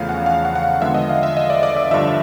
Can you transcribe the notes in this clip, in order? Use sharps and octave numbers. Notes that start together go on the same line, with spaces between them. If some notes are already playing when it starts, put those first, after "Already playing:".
Already playing: E2 C#3 F3 A3 F5
F#5
F5
F#5
F#5
F5
D3 F3 G#3 B3 E5
D#5
F5
E5
D#5
D5
D5
E5
G2 D3 F3 E5